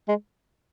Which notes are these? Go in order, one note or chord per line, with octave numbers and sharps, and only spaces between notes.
G#3